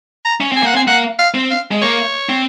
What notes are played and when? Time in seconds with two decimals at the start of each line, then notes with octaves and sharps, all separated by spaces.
0.25 A#5
0.41 C#4
0.52 C4 G#5
0.63 A#3 F#5
0.75 C4 G#5
0.88 A#3 F#5
1.19 F5
1.34 C4
1.50 F5
1.71 G#3
1.82 A#3 C#5
2.29 C4